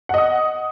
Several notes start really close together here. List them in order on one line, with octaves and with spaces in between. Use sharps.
F#5 D#5 D#6